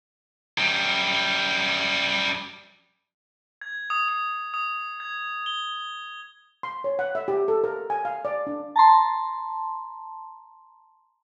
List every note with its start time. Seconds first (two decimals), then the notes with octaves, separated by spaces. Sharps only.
0.58 F#2 G3
3.61 G#6
3.90 D#6
4.08 D#6
4.54 D#6
5.00 G#6
5.46 G7
6.63 C6
6.84 C#5
6.99 F#5
7.15 E5
7.28 G4
7.48 A4
7.64 A#4
7.90 G#5
8.05 F5
8.25 D5
8.47 D4
8.76 A5 A#5 C6